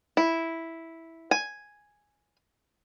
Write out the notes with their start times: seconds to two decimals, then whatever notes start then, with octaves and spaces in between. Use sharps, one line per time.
0.17 E4
1.31 G#5